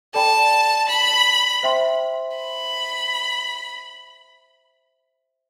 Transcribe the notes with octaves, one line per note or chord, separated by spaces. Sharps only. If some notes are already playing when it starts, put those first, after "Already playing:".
A4 D5 G5 A5 B5
B5
C5 E5 G5 C6
B5